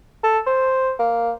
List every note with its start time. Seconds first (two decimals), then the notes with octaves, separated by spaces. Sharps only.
0.24 A4
0.46 C5
0.99 A#3